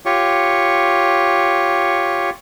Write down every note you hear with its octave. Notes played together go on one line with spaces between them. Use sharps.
F4 G4 C#5 C#6